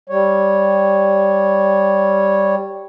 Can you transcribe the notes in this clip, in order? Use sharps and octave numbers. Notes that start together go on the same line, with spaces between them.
G3 C#5